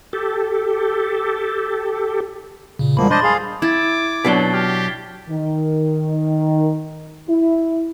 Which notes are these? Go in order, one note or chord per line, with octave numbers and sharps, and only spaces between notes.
G4 A4
A#2 C#3
E2 F3 G3 G#3 A#3 B5
D4 C5 D#5 B5 C6 A6
G#4 F5
E4 D6 G#6 A6
B2 F#3 D4 B6 C7 G7
G4 F6
D#3
E4